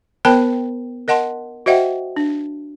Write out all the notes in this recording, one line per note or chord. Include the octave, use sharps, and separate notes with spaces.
B3 A#4 C5 G5 A5 B5
A#4 D#5 F#5 A5 C6
F#4 C5 D#5 E5 F#5 G5
D4